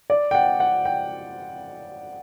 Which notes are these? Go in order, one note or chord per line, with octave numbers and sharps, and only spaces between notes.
D5
G5
F#5
F#5
G5